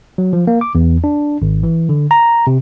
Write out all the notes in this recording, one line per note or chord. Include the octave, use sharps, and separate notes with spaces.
F#3
F3
A#3
D6
E2
D4
G#1
E3
D3
A#5
C3